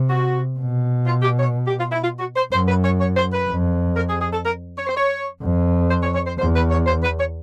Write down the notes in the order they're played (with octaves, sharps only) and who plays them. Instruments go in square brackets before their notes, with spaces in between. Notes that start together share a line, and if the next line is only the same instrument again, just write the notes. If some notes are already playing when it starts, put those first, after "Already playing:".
Already playing: [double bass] C3
[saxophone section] F#4
[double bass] B2
[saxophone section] F4
G4
C#5
G4
F4
E4
F4
F#4
C5
[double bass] F#2 [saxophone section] C5
[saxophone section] B4
C#5
C#5
C5
B4
[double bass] F2
[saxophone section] A#4
G#4
G#4
A4
A#4
C#5
C5
C#5
[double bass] F2
[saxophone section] C5
C#5
C#5
C5
[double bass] E2 [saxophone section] C5
[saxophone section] B4
C#5
C5
B4
C#5